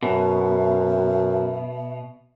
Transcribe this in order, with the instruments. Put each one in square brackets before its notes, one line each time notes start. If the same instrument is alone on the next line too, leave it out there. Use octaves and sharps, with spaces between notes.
[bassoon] F#2 [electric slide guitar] B2 [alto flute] E5